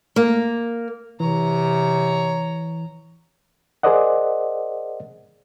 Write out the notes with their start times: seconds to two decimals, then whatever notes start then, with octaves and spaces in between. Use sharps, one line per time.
0.16 A#3
1.20 C3 E3 C#5 A#5
3.83 G#4 A#4 C5 D5 D#5 F#5